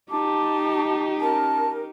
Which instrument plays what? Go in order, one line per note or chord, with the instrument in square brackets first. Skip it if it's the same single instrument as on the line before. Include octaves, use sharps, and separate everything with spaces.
[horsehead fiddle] D#4 G4 [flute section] A5 [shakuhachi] D6
[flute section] C#4 A#4 [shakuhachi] A5